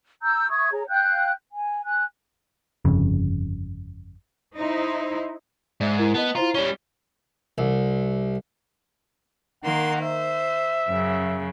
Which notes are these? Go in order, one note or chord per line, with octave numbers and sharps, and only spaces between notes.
A#5 E6 G6
E5 C#6 D#6 G#6
G#4 C#5 A#5
F5 G5 F#6 G6
G#5
G#5 F#6
G1 F2 C#3
D#4 E4 C5
G#2 D5 E5
E4 A#4 G#6
B3 D#5 A5
E4 F4 C5 A#5
G3 C#4 C#5 G7
C2
D#3 A#3 F#5 C6
C5 E5
F#2 C#3